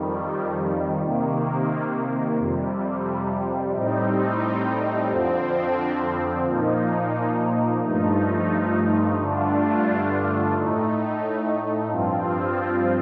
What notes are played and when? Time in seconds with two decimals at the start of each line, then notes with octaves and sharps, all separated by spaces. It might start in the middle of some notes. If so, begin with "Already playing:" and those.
Already playing: F2 D#3 G3
1.04 C3 D#3 A#3
2.39 F2 C3 G3
3.75 A2 G3 C4 D#4
5.11 F2 D3 F3 C4
6.46 A#2 F3 A#3 D#4
7.82 G2 F3 A3 D#4
9.18 G2 D3 A3 D4 F4
10.54 A2 A3 D#4
11.90 G2 F3 C4 F4